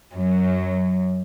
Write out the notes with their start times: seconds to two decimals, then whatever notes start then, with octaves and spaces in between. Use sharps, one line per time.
0.15 F#2 F#3